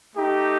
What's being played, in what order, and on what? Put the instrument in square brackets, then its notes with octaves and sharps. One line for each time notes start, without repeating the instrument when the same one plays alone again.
[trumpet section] A3 D#4 G4